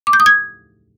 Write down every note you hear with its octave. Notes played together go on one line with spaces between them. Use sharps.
D6
G6
D#6
G#6